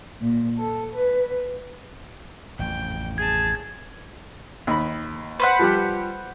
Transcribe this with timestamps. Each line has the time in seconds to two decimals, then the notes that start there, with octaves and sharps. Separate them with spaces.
0.20 A#2
0.59 A4
0.94 B4
2.59 A1 F2 G5
3.18 G#4 A5 G#6
4.67 D#2 B5
5.40 B4 C5 F#5
5.59 F3 G3 G4